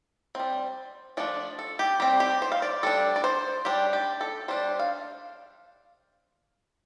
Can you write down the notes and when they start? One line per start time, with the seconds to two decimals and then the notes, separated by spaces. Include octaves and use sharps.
0.35 G3 C4
1.17 F3 A3 D4 D5
1.59 A4
1.79 G4
2.00 G3 C4 G4
2.20 G4
2.42 C5
2.52 F5
2.62 D5
2.83 G3 D4 A4
3.16 D5
3.24 C5
3.65 G3 D4 G4
3.93 G4
4.21 A4
4.48 G3 D4 C5
4.79 F5